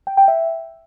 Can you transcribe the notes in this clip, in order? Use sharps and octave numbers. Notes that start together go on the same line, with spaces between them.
G5
G5
E5